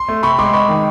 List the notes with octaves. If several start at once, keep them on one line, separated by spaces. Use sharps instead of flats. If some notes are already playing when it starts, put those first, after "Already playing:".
Already playing: C6
A3
C3 B5 C#6
G#3 C6 D6
G#3 B5 C#6
D#3